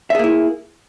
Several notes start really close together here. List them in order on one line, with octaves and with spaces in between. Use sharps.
E5 G#4 A#3 E4